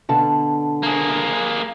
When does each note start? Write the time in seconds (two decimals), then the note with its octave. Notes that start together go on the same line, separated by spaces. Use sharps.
0.09 B2 D3 A5
0.83 A#3 G#4